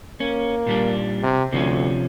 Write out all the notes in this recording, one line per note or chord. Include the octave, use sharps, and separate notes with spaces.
A#3 C#4
A#2 G3 D4
C3
D2 C3 F3 C#4